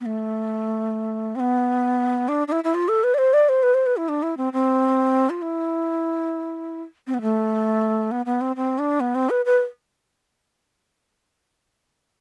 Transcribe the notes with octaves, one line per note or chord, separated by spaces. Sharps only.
B3
A3
C4
B3
D4
D4
E4
E4
F4
A4
B4
D5
C5
D5
C5
B4
C5
B4
E4
D4
E4
C4
C4
F4
E4
C4
B3
A3
B3
B3
C4
C4
D4
B3
C4
B4
B4